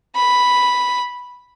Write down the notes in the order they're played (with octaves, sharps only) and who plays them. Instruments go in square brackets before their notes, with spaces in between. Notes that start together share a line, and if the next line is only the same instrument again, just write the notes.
[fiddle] B5